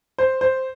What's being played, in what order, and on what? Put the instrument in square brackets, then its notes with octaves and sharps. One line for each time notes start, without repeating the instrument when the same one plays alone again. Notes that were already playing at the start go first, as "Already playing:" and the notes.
[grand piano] C5
C5